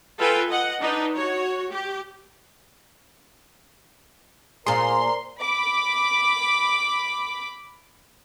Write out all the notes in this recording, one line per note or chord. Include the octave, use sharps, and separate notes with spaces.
F4 A4 B4 F5 G5 G#5
D#5 F#5
D4 D#4 B4
F#4 C#5
G4
A#2 G#4 A#4 C5 D5 A#5 C6
B5 D6